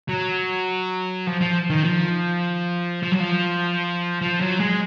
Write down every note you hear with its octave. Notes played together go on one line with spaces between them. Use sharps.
F#3
F3
F3
D#3
F3
F3
F#3
F3
F3
F#3
G#3